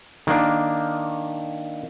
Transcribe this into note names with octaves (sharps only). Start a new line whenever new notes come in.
D#3 A#3 D4